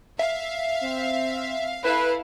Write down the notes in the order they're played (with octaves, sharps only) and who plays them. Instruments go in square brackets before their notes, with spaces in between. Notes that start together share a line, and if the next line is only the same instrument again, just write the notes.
[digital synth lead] E5 [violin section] F5
[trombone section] C4
[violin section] E4 A4 F5 [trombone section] B4